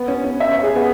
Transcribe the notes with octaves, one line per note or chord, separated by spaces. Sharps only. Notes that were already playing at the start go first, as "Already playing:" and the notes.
Already playing: B3
C#4
C#4
E5
C#5
G#4
B3